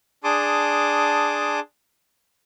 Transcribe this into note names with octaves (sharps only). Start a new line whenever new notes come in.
D4 G#4 A5 C6 D6 D#6